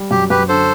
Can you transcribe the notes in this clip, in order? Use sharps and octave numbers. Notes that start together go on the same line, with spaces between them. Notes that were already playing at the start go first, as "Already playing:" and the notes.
Already playing: G3
F#2 G4
F#2 G4 B4
D3 A4 C5